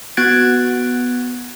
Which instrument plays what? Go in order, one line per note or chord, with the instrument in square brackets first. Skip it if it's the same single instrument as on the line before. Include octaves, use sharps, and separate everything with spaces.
[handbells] B3 F#4 F#6 G#6 A6 D7